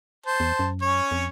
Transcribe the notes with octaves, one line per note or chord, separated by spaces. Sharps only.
C5 A5
E2
F#2
C#4 C#5
F2